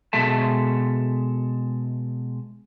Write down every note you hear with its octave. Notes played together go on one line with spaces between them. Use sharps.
B2 G#3 A4 E5 A5